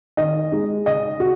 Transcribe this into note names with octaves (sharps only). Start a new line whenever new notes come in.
D#3 D#5
G#3 D#4
C#3 D#5
F#4